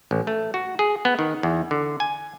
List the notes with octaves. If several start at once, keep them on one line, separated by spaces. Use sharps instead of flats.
A1
A3
F#4
G#4
B3
D#3
E2
D3
G#5